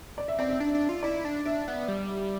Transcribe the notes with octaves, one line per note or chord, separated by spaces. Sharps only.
D5
E5
C4 D5
E5
D4
D4
F4
E4 D5
D4
D4 E5
B3
G3